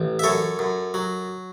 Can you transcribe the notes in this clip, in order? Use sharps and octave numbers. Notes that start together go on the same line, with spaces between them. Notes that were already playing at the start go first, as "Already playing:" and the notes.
Already playing: A1
E5
F#2 A4 C#5
F#2
F#3